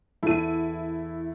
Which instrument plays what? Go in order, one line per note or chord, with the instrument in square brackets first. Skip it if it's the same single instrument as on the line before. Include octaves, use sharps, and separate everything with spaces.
[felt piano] E2 A4 [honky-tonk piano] E4 D#7